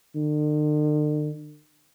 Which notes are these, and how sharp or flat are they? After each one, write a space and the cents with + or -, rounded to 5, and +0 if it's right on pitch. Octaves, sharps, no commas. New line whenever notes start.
D3 +45